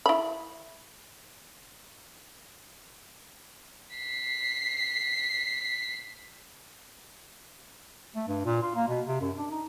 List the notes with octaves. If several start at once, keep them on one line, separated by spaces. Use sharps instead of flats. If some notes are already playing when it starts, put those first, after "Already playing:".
E4 B5
B6 C7
A3
G2
A#2
F4
A#3
B2
C3
F#2
D4
D#4